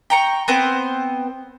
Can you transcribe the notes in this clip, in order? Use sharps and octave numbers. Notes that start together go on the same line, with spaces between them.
G5 A#5 C#6
B3 C4 C5